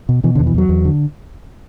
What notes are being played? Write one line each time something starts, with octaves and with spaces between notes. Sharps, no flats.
B2
B2 E3
D3
E2
E3
E2 F#3
E2
D3